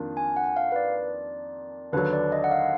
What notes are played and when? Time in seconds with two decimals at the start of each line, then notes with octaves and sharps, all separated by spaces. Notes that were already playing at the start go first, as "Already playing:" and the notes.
Already playing: F2 D#3 A#3 D4 F4
0.17 G#5
0.37 F#5
0.57 F5
0.72 B4
0.76 D5
1.93 D#2 D3 F#3 B4
2.13 D5
2.32 D#5
2.44 F#5
2.51 F5